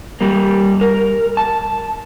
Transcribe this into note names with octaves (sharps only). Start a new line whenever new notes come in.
G3 A#3
A#4
A5